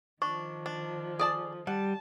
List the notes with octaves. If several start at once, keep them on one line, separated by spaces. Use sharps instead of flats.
D#3 F3 D4 C#6
D4
G#4 A4 D5 A5
G3 F#5 A5